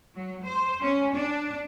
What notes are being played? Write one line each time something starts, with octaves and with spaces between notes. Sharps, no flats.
F#3
C5
C#4
D4